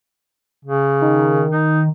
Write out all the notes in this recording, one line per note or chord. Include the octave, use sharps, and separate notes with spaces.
C#3
D#3
D#4